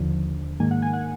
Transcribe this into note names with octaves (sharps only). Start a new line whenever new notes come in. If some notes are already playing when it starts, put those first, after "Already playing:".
Already playing: D#2 D3 F3
G#2 D#3 A#3 G#5
F#5
G#5
F#5